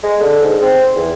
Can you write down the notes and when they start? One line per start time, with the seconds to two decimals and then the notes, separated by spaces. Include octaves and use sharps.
0.03 G#3
0.20 D3
0.42 G#2
0.61 C4
0.96 E2